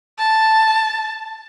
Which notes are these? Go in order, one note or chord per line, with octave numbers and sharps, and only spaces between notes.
A5